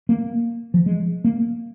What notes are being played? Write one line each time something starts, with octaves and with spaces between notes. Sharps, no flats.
A#3
F3
G#3
A#3